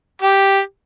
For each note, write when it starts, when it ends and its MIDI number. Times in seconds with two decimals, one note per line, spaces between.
0.22 0.60 67